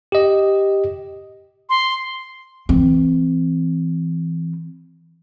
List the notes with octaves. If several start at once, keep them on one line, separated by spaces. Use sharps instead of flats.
G4 D#5
C6
E3 C4